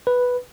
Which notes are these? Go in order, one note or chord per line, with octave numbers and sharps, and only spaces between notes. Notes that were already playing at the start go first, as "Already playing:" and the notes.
B4